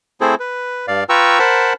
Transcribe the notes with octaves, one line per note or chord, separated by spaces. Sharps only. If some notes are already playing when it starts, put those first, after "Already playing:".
A3 C4 E4 G#4 A4 C5
B4
G2 D5 F5
F4 B4 G5 A#5 C#6 E6
A#4 C5 F#5 A5 B5